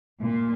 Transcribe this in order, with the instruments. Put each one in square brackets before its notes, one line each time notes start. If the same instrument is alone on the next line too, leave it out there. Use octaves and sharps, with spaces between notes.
[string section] A#2